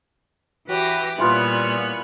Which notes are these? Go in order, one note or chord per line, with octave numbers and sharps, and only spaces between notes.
E3 F#4 G4 B4 A#6
A#2 E3 G3 B3 F4 B4 C#5 F#6